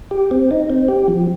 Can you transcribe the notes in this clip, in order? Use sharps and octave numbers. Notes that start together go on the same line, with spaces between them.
G4
C4
D#4
C4
G4
F3